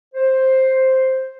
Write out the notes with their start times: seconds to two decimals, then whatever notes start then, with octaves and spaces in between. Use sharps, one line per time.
0.15 C5